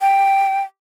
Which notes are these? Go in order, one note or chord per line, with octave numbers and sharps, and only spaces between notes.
G5